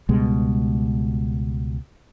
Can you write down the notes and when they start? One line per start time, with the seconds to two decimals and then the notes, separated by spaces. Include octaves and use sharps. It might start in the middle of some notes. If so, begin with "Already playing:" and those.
0.09 C#2 B2 G3 G#3